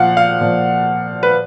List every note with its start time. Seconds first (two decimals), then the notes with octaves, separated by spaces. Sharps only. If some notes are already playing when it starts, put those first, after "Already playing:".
Already playing: A#2 F3 F5 F#5
0.17 F5
0.41 A#2 F3
1.23 B4